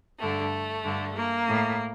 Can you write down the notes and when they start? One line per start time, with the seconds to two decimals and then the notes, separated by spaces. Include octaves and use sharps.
0.19 G2 D3 A3
0.83 G2 D3
1.14 A#3
1.47 A2